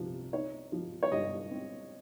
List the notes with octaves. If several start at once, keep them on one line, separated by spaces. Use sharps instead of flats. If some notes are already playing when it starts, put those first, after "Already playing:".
Already playing: C2 F3
D#4 C#5
F3
C#5
G2 D#5
C4